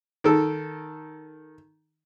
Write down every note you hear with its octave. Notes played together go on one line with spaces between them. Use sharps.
D#3 A4